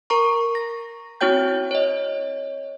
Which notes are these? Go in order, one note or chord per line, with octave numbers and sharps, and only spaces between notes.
A#4 A#5 C#6
A#6
C4 E4 F#4 C#5 G5 G6
C#5 D#5